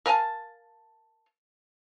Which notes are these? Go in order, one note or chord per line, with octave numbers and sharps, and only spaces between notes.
A#4 F5 G#5 A5